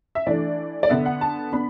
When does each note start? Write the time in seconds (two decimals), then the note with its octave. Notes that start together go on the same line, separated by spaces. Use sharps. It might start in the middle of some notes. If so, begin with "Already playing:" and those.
0.15 E5
0.27 E3 A3 D4 D5
0.83 D5
0.89 D3 B3 D4 E5
1.06 F#5
1.21 A5
1.52 B3 D4 B5